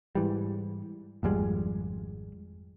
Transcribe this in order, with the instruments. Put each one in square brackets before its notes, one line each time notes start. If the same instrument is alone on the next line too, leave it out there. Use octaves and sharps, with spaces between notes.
[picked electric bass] G#2 E3 G3
G#1 F2 G3 G#3